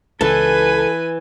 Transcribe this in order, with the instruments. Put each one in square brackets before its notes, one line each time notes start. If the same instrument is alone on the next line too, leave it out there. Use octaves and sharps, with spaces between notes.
[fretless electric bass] C#2 [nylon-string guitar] E3 [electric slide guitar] A4 [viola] B4 G#5